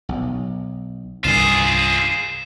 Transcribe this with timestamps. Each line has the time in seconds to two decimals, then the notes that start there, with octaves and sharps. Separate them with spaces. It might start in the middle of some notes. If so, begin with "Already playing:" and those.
0.09 B1
1.24 C2 G2 D#3 F4 G#4 C7 E7